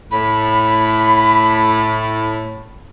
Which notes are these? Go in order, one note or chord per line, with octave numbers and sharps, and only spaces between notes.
A2 B5